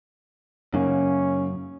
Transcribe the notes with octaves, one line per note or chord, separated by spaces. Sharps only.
F#2 C#3 A#3 C#4 D#4